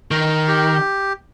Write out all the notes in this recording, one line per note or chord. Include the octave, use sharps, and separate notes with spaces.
D#3 A#4
G4